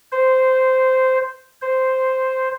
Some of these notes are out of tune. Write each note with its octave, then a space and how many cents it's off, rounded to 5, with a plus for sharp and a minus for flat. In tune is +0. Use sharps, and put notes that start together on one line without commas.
C5 -10
C5 -5